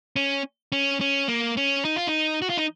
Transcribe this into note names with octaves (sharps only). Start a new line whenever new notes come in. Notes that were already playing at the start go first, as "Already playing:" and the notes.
C#4
C#4
C#4
A#3
C#4
D#4
F4
D#4
F#4
F4
D#4